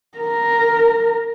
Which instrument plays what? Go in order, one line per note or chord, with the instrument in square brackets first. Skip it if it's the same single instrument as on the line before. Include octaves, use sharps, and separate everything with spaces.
[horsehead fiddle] A#4